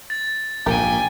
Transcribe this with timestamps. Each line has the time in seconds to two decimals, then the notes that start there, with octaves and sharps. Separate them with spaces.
0.10 A6
0.66 A#1 G#2 G4 A#4 G5 G#5